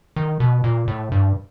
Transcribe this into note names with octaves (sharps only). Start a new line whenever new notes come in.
D#3
B2
A#2
A2
G2